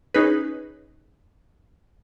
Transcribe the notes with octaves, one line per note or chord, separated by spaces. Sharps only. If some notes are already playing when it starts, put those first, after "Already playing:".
C#4 D#4 G#4 B4